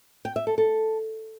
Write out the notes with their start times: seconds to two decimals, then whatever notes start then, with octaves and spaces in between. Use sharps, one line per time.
0.25 G5
0.36 E5
0.47 A4
0.58 A4